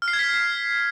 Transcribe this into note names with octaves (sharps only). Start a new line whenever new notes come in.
F6
C7
G#6
B6